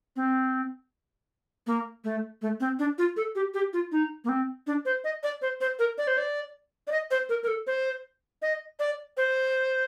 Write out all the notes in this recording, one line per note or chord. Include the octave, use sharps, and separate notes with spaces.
C4
A#3
A3
A3
C4
D4
F4
A4
G4
G4
F4
D#4
A#3
C4
D4
C5
D#5
D5
C5
C5
A#4
D5
C5
D5
D5
D#5
C5
A#4
A#4
A4
C5
D#5
D5
C5